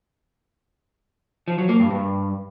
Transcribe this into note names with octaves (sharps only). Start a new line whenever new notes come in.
F3
F#3
A#3
G2
G2